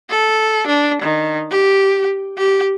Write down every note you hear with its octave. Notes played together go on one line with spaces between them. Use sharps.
A4
D4
D#3
G4
G4